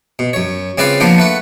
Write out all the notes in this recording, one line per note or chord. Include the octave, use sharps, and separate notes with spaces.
B2
F#2 C#5
C#3 C4 F4 B4 D5 F5
F3 A#3 B3 D4 F4
A3 B4 F#5